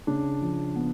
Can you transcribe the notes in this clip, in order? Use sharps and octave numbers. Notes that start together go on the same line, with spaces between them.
C#3 D4
F3
B3